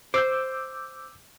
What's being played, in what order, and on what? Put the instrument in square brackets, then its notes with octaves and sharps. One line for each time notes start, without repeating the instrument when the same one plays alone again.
[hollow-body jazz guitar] C5 [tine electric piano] D6 E6 G6